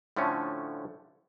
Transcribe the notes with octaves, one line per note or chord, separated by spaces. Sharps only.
A2 D3 F3 A3 C#4